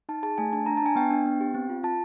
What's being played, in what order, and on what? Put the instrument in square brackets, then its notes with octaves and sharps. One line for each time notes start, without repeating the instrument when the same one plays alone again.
[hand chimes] D#4 A5
G#4 A5
A3 G#5
D4 A5
D4 A#5
A5
D4 G#5
B3 G5
D4
B3
G4
C4
F4
F4 A5